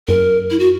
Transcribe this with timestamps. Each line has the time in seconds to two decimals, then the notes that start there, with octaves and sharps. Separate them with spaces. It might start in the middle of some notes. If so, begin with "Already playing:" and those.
0.08 F#2 A#4
0.51 E4
0.59 F#4